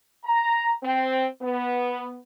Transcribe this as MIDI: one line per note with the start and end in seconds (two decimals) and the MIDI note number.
0.24 0.72 82
0.83 1.25 60
1.42 2.17 59